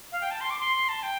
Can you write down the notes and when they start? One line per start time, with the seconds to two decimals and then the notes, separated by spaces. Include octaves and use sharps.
0.12 F5
0.21 G5
0.30 A5
0.40 C6
0.50 D6
0.59 C6
0.88 A5
1.02 G5